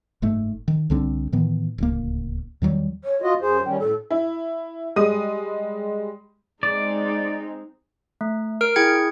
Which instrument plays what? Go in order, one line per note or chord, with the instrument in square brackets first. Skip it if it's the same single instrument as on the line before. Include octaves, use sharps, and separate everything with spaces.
[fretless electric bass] F#1 G#2 A3
D#3
C2 D3 C4 D4
A2 D#3 E3 B3
D1 C#2 A#3
E2 D#3 F#3 G3
[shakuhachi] C#5
[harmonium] F4 D#5 [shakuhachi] F#4
[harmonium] F#2 C5 [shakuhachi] G#4
[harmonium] D#3 G3 C#4 [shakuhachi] G5
[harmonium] A2 [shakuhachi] A4
[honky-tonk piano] E4
G3 G#3 D#6 D#7
[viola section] G#3 C4 D#4 [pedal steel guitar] D5
[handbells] A3
A#4 F6 D7
E4 G#4 G5 G#6 C#7